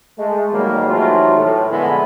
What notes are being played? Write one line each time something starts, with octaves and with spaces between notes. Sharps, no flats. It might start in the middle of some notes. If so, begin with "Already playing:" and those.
G#3 A3
G#2 D#3 F#3 G3 A#3
C3 E3 F#3 A3 D#4 F4
A2
A#2 D3 F3 G#3 B3 E4